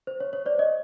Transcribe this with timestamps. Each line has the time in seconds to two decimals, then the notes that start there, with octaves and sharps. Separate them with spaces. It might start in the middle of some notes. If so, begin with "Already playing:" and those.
0.07 C5
0.20 C#5
0.33 C#5
0.46 C5 D5
0.59 C#5 D#5